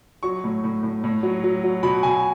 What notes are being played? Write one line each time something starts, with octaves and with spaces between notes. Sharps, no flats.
F#3 C#6
A2
A2
A2
A2
F#3
F#3
F#3
B2 B5
B2 G#5